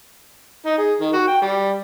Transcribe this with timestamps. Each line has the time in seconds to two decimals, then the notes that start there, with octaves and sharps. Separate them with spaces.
0.66 D#4
0.78 G#4
1.00 D#3
1.13 F#4
1.27 G5
1.42 G3